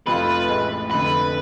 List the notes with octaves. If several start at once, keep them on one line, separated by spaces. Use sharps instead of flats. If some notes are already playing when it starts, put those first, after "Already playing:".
F1 F2 F3 A3 F4 B4
A1 A2 G#3
F1 F2 D3 B4